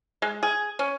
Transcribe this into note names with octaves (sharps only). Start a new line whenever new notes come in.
G#3
G#4
C#4